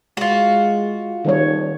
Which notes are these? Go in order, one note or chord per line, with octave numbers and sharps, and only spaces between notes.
G#3 F4 F#4
D#1 D#3 G3 C#5